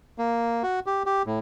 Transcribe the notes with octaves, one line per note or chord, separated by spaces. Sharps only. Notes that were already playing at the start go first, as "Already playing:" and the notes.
A#3
F#4
G4
G4
A2